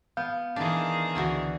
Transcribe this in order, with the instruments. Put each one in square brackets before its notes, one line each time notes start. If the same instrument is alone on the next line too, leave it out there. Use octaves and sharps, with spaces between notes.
[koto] B3 [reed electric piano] F5 G6
[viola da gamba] D#3 G#4 [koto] E3 D4
[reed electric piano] C#2 [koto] D3 E3 F#4